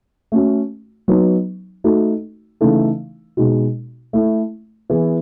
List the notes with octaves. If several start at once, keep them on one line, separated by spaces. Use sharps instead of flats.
A3 C#4 F#4
F#3 B3 D#4
A3 D#4 F#4 A4
C#3 E3 A3 D#4 A4
B2 G#3 D#4 F#4
A3 E4 A4
E3 B3 E4 G#4 B4